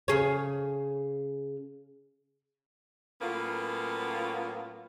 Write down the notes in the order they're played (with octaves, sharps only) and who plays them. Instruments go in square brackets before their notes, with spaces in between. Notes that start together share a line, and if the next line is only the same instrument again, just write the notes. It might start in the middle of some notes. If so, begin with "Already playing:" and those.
[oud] C#3 G#4 C#5
[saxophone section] A2 F#3 A#3 B3 C#4 F4